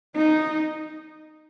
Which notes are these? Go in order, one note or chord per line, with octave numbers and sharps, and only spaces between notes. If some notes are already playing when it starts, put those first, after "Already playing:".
D#4